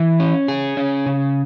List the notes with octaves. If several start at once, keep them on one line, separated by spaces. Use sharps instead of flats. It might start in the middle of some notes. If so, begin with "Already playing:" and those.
Already playing: E3
C#4
G#4
C#4
C#3